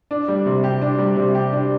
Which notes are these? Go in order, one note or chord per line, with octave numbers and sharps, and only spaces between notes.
D4
G3
C3
G4
D4
G3
C3
G4
D4